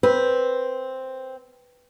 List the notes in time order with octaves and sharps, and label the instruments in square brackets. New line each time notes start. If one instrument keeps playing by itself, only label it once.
[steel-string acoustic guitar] C4 [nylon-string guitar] B4